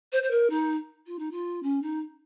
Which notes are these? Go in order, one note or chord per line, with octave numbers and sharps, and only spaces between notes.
C5
C5
A#4
D#4
F4
D#4
F4
C#4
D#4